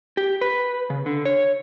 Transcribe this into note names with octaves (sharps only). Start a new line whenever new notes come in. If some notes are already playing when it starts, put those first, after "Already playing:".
G4
B4
C#3
D3
C#5